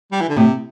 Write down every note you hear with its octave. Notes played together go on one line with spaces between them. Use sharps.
G3
E3
D3
A2 C3